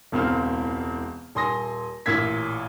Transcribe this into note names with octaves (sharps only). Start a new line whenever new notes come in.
E1 C#2 C4 F6
D#1 G#5 C6 D#6 A#6
A1 A#2 A#3 E6 G#6 B6